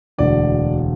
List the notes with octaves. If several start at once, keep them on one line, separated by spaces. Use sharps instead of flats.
E1 D2 D3 D5